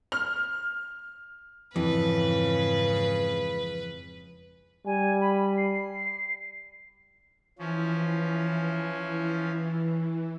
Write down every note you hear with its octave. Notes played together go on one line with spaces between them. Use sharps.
F6
F2 G#2 C#3 E3 B4
G3 G#5
B5
C7
E3 F3 C#4